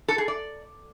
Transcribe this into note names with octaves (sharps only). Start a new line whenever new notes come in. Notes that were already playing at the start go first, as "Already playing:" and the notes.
A4
G#4
D5